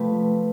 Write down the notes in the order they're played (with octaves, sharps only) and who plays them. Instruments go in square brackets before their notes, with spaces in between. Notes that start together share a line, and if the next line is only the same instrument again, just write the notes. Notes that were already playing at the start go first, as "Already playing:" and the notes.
Already playing: [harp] C3 F3 A3 B4